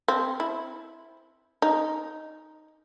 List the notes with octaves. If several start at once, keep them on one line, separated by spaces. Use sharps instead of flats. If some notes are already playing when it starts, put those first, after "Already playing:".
C4
E4
D#4